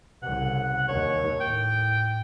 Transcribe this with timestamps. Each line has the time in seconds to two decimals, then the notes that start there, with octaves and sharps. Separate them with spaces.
0.23 C2 C#3 F#5
0.88 D#2 C#5
1.41 A2 G5